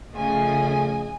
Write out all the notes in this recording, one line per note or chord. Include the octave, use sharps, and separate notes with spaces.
C#3 F3 A3 G#4 D#5 G#5